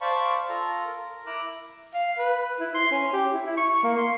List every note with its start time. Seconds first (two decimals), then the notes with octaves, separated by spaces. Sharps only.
0.01 C5 D5 F5 A5 B5 C#6
0.49 F4 A4 A#5
0.86 A#4
1.27 E4 A#5 D6 E6 F#6
1.94 F5
2.18 B4
2.60 E4
2.75 C6
2.91 C#4
3.13 G4
3.32 E4
3.46 E4
3.57 C#6
3.83 A#3
3.98 C6